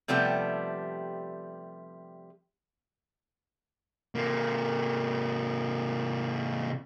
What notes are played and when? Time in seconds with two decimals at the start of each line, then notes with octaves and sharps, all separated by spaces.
0.08 C3 F3 G3 A3 B3 G4
4.15 C3 A#3